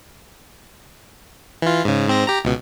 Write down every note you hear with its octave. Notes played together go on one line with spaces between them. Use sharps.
E3 F4
G#2 C#3
G#2 C4 A#6
G4 A#5
C#2 B2